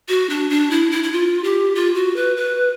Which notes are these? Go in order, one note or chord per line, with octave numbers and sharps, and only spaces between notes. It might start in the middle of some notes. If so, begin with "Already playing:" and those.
F#4
D4
D4
E4
E4
E4
F4
G4
F4
F#4
B4
B4